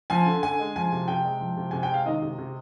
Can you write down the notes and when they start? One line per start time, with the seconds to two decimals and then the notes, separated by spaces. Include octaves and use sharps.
0.10 F3 G#5
0.26 D3
0.43 D3 G#5
0.59 G#3
0.76 F3 G#5
0.92 C3
1.08 C3 G5
1.25 G#3
1.41 F3
1.57 C3
1.71 C3 G#5
1.83 G5
1.90 G#3 F5
2.06 D#3 D#5
2.22 C3
2.38 C3